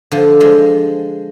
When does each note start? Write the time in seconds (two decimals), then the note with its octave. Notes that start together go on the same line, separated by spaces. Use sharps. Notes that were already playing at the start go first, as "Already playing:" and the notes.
0.12 D3 F3
0.40 F3 G#3